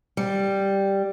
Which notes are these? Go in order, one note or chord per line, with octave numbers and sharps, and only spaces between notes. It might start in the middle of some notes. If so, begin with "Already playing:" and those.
G3